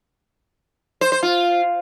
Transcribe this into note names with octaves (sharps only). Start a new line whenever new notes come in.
C5
C5
F4